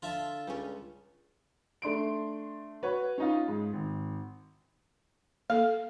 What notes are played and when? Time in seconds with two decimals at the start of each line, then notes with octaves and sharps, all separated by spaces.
0.02 D3 F3 F4 E5 A5
0.47 C#2 G3 C#4
1.82 A3 D4 C6 D7
2.83 F#4 B4 C#5
3.18 C#4 D#4 F4
3.48 G#2
3.73 G#1
5.50 A#3 A4 F5